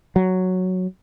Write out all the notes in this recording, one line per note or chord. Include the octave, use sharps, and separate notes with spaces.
F#3